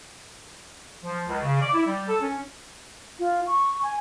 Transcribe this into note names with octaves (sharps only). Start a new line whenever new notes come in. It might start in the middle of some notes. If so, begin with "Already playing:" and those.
F3
C#2
C#3
D5
E4
G3
A4
C#4
F4
C#6
G#5